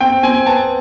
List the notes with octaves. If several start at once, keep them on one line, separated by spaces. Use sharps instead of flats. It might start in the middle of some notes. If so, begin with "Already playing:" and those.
C4 G5
C4 G#5
B3 A5